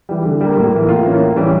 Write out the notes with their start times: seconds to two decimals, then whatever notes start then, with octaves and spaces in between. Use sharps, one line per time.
0.09 E3 G3
0.25 D3
0.41 G3 A#3
0.57 A2
0.72 E3 A#3
0.89 A2 F4
1.05 E3 A#3 C#4
1.21 A2
1.36 E3 G3 C#4